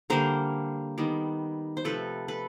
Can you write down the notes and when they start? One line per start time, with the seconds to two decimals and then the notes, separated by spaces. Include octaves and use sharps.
0.10 D3 G3 A#3 A#4 C5
0.98 D#3 G3 B3
1.77 C5
1.84 C3 F3 A3 A4 B4
2.28 A4 B4